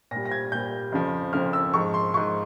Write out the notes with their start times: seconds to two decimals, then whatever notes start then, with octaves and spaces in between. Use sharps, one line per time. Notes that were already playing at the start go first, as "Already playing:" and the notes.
0.11 A#2 G3 A#6
0.26 A#6
0.32 G#6
0.52 A#2 G3 G6
0.92 F2 C#3 F3
1.33 F2 C#3 F3 F6
1.53 E6
1.74 G#2 F3 C#6
1.94 C6
2.14 G#2 F3 C#6